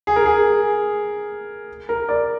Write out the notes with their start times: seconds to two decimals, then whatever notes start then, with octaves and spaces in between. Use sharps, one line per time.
0.07 G#4
0.16 A#4
0.26 G#4
1.89 A#4
2.09 D5